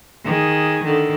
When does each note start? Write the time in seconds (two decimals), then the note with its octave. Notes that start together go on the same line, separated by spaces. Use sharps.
0.24 D#3 G#4
0.83 D3 D#3